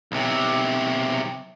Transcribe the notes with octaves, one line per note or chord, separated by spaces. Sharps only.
B1 C3